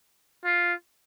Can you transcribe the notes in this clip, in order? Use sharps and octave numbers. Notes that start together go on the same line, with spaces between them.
F4